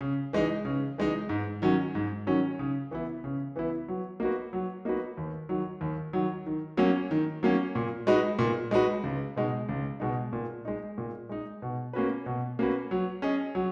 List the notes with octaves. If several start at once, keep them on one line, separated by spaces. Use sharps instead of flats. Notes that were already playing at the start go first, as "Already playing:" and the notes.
C#3
E3 G#3 D#4
C#3
E3 G#3 D#4
G#2
D#3 F#3 C#4
G#2
D#3 F#3 C#4
C#3
E3 B3 E4
C#3
E3 B3 E4
F#3
A#3 D#4 F#4 B4
F#3
A#3 D#4 F#4 B4
D#2
D#3 F#3
D#2
D#3 F#3
D#3
F#3 A#3 C#4
D#3
F#3 A#3 C#4
A#2
G#3 D#4 F#4 B4
A#2
G#3 D#4 F#4 B4
C#2
B2 G#3 D#4
C#2
B2 G#3 D#4
A#2
G#3 D#4
A#2
G#3 D#4
B2
A#3 C#4 F#4 B4
B2
A#3 C#4 F#4 B4
F#3
C#4 G#4 D#5
F#3